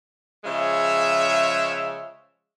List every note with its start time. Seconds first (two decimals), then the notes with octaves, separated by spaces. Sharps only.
0.44 C#3 F3 G#3 C#5 E5